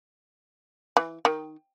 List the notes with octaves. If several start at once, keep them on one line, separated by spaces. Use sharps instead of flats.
E3
D#3